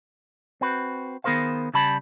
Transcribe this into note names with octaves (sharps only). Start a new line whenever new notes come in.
C4 F#4 B4
D#3 B3 G#4 A#4 C5 F5
C#3 G3 D5 A5 B5